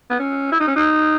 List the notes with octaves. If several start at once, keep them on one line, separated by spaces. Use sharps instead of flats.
B3
C#4
E4
D#4
C#4
D#4